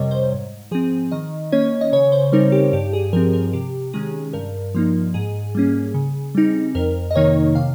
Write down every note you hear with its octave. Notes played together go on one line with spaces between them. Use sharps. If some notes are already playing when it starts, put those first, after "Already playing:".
Already playing: F2 C3 G3 A#4 C#5 D#5
C5
G#2
F3 C4 G#4
D#3 D#5
A#3 C#4 C#5
D#5
C#3 C#5
C5
G3 C4 D#4 A#4
G4
G2 G4
G#4
F3 C4 A#4
A#4
C3 G4
D#3 G#3 C#4 G#4
G2 A#4
F3 A#3 D#4
G#2 G#4
G3 A#3 C#4
C#3
G3 C4 D#4
F2 A#4
D#5
C3 D#3 A#3 D#4 C#5
C3 F5